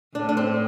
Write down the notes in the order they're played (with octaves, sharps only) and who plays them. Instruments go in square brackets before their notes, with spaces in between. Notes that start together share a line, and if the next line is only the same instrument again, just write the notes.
[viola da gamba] A2 [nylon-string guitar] D4
[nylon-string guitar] D4
C4